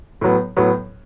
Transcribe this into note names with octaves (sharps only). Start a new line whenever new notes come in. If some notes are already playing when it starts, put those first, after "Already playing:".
A2 F#3 B3
A2 F#3 B3